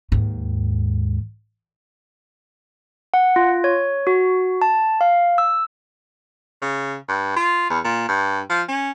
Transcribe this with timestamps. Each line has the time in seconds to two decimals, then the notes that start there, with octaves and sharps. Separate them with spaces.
0.12 D#2 G#2
3.14 F#5
3.36 F4
3.64 C#5
4.07 F#4
4.62 A5
5.01 F5
5.38 E6
6.62 C#3
7.09 G2
7.36 F4
7.70 E2
7.84 A#2
8.09 G2
8.49 F3
8.69 C#4